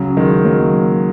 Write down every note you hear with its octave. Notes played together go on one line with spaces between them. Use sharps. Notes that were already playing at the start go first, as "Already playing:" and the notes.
Already playing: C#3 F#3
D#3 G#3
F#3 A#3